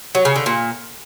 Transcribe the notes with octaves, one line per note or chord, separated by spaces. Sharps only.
F#3
C#3
D3
A#2